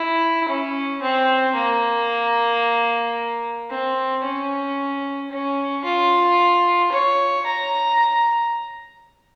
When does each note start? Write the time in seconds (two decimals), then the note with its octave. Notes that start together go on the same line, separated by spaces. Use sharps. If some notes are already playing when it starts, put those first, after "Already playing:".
Already playing: E4
0.48 C#4
1.02 C4
1.55 A#3
3.70 C4
4.23 C#4
5.31 C#4
5.85 F4
6.92 C#5
7.46 A#5